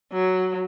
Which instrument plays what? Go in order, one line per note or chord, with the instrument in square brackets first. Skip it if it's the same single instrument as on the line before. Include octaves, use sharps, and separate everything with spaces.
[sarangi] F#3